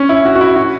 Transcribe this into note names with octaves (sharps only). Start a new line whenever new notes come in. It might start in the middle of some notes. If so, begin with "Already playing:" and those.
Already playing: C#4
E4
F#4
F#4
E4
F#4